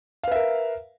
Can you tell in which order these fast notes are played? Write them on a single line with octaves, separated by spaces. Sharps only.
F5 B4 E5 A#4